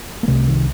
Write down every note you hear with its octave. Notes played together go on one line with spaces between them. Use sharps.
A#3
C2 C3 A3 C4
D#3